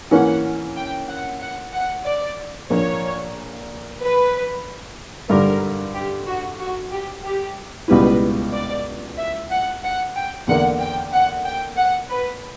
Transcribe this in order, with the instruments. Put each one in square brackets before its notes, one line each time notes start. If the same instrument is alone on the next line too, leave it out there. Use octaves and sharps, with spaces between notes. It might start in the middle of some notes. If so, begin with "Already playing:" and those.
[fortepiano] E3 A#3 C#4 [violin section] F#5
[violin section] G5
F#5
F#5
F#5
D5
[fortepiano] A#1 A#2 A#3 [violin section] C#5
[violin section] B4
[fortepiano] G2 D3 G3 [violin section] A#4
[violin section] G4
F#4
F#4
G4
G4
[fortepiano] C#2 B2 G3 B3 E4 [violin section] B4
[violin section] D5
E5
F#5
F#5
G5
[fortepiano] E2 D3 A#3 [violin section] F#5
[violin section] G5
F#5
G5
F#5
B4